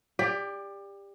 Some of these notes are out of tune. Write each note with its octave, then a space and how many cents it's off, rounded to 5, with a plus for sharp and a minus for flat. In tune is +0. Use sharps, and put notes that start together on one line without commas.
G4 +25 D5 +0